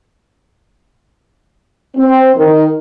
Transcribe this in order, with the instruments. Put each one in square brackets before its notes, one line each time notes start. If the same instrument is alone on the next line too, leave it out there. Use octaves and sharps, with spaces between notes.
[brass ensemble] C4
D#3